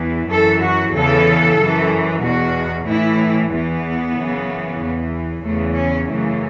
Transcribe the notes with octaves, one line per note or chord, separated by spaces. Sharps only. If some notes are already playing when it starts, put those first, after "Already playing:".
Already playing: E2 E3
F#2 E3 A4
F#4
E2 C#3 E3 A4
F#2 E3
E2 B2 F#4
A2 E3 E4
E2 E3 B3
F#2 C#3 E3
E2 E3
E2 C#3 E3 A3
C#4
F#2 C#3 E3 A3